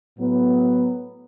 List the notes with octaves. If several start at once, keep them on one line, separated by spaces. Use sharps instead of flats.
A2 F#3 B3